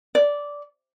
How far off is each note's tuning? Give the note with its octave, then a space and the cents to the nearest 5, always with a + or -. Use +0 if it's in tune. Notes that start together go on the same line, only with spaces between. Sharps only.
D5 -10